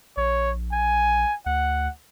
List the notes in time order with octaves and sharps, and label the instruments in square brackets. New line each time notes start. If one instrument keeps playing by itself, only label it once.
[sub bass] A#1 [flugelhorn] C#5
[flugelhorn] G#5
[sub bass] D2 [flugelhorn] F#5